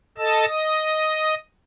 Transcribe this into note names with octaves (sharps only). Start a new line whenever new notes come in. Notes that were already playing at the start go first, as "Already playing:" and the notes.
A4 D#5 A5 E6
D#5 D#6